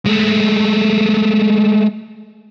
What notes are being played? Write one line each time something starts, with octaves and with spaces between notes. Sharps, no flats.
G#3 A3